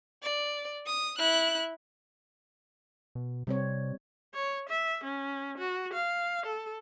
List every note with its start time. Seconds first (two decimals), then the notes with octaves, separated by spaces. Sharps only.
0.23 D5
0.86 D#6
1.18 E4 F#6
3.15 B2
3.47 C3 G3 C4 C#5
4.35 C#5
4.69 E5
5.04 C#4
5.58 F#4
5.93 F5
6.46 A4